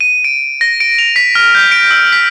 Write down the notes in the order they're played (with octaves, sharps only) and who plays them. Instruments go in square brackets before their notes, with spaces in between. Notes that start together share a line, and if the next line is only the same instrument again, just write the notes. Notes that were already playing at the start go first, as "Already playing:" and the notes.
[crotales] D#7
D7
A#6
D7
F7
B6
F6
G6
D7
E6
B6